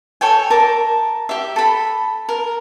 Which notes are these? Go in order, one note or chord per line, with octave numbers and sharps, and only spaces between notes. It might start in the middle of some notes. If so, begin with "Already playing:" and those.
A4 C#5 G5 G#5
A#4 A5 D6
G4 E5
A4 B5
A#4